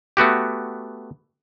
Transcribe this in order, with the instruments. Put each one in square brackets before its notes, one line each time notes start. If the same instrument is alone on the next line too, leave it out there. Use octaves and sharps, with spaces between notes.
[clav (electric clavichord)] A3 B3 F#4 G4